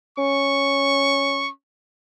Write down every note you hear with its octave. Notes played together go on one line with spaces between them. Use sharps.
C#4 C#6